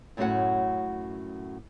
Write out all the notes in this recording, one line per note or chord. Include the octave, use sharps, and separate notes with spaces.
F#2 A2 A3 C#4 F#4 F#5